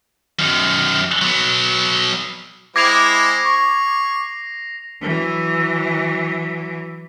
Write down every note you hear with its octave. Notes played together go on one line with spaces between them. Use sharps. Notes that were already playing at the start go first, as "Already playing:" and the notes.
F#2 D#3
F#3 B3
G#3 C4 E4 D6 G#6 A#6 C7 F7
C#6
E3 F#3